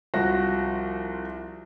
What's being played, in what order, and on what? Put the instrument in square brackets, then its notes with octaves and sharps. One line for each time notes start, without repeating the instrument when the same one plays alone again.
[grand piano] C2 F3 F#4 A#6